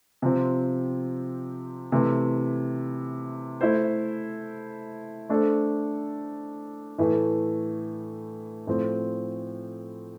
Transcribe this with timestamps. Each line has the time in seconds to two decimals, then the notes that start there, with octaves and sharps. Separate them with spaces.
0.22 C3 F3 C4
1.92 C3 E3 A3 E4
3.61 A3 E4 A4 C5
5.29 A3 D4 A4 C5
6.98 A2 E3 A3
8.67 A2 F3 C4